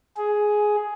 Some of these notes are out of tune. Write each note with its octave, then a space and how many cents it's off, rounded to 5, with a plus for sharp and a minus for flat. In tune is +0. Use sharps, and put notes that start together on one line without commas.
G#4 +10